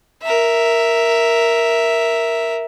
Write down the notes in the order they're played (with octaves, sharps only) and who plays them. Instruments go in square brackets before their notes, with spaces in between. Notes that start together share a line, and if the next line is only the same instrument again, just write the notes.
[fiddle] A#4 E5